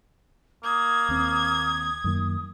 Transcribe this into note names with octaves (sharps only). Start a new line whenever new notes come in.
A#3 D#6 G#6
D#2 C4
F#2 D#3 A#3